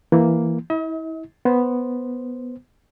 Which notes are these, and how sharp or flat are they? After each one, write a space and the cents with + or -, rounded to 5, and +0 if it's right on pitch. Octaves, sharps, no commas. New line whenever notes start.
E3 +10 A#3 +0
E4 -30 D#5 +45
B3 +0 C5 +0